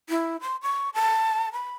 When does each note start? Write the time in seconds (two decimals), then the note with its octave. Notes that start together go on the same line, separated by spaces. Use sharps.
0.10 E4
0.41 C6
0.63 C#6
0.94 A5
1.53 B5